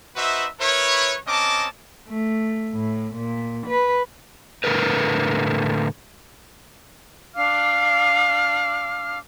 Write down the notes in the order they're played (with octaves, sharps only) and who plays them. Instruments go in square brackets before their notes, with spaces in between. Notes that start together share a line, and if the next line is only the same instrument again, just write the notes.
[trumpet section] D#4 F#4 B4 C5 E5
E4 A#4 B4 C#5
C4 C#4 A#4 D#5 A5 D6
[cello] A3
A2
A#2
B4
[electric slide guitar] A2 D3 A#4 B4
[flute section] D4 F5 D6 F6